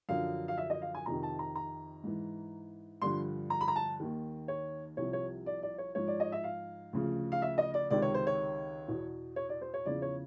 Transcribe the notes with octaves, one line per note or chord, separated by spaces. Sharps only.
F#2 D3 F3 F5
F5
E5
D#5
F5
G#5
F2 C3 D#3 A#5
A5
A#5
A#5
G#2 E3
G2 D3 F3 C6
A#5
B5
A#5
A5
D#2 D#3
C#5
C2 C3 F3 C#5
C#5
D5
D5
C#5
G#2 F3 C#5
D5
D#5
E5
F5
D2 C#3 F3
F5
E5
D#5
D5
C#2 C3 D#3 D5
C#5
C5
C#5
E2 B2
C#5
D5
C5
C#5
E2 C#3 F3 D5
C#5